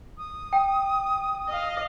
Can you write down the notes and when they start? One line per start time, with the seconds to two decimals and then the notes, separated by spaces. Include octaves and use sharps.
0.18 D#6
0.53 G5
1.48 D#5 F5